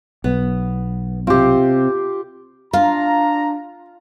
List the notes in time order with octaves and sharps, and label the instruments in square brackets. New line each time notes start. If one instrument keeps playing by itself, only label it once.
[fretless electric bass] B1 [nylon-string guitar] B3
[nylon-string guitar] C3 C4 [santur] F4 G4
[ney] D4 [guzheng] F4 [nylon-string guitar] F5 [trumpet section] A#5